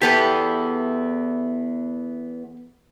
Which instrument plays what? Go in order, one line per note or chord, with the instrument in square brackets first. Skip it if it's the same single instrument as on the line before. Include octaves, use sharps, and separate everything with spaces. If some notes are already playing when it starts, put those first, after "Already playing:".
[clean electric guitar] E2 B3 [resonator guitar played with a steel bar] G4 A4 B4